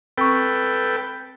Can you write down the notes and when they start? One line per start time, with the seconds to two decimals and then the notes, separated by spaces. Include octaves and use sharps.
0.18 C4 A4 B4 G5 C#6